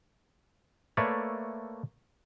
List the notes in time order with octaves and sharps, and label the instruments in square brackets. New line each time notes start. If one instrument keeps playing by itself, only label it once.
[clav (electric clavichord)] A3 A#3 B4 C#5 D5 E5